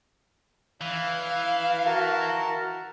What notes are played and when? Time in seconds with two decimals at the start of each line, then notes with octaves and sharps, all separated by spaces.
0.81 E3 F5
1.86 F#4 A#4 A5